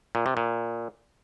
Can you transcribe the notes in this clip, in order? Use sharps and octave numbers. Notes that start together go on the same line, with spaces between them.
A#2
C3
A#2